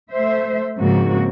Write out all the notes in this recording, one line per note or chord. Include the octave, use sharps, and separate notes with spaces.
A3 C5 E5
G#2 C#3 F3 A#3 C4 F#4